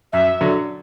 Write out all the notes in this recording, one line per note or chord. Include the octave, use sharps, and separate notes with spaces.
F#2 E5
D3 F#3